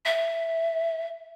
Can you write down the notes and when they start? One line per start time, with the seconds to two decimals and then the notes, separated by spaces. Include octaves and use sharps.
0.06 E5